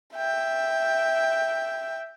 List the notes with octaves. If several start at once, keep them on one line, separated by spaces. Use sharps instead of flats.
E5 G5